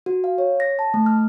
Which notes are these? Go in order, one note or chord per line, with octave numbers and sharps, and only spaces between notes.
F#4
F5
C#5
A#6
A5
A3
F6